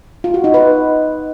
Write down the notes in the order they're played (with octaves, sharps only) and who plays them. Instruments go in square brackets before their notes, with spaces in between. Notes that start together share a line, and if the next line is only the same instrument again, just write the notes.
[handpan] F4
F#4
D#4
B4